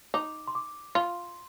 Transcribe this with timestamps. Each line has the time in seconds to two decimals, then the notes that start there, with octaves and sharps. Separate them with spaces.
0.14 D#4 D6
0.47 C6
0.55 D6
0.95 F4 C6